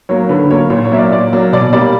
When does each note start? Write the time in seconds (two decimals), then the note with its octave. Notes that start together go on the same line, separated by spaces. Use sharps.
0.09 F#3 A#3 C#5
0.29 D3 B4
0.50 F#3 A#3 C#5
0.70 A#2 C#5
0.85 C#5
0.92 F#3 A#3 E5
0.98 D5
1.12 A#2 D5
1.33 F#3 A#3
1.53 B2 D5
1.73 G3 A#3 D5